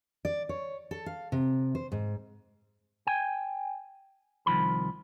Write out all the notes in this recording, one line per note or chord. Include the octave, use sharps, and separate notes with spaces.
D5
C#5
A4
F5
C3
C5
G#2
G5 G#5
C2 F2 D#3 F3 B5